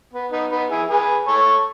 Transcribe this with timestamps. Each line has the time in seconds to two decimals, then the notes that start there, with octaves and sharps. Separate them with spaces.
0.13 B3
0.32 B3 D#4
0.51 B3 D#4
0.70 E4 G#4
0.89 G#4 B4
1.28 A4 C#5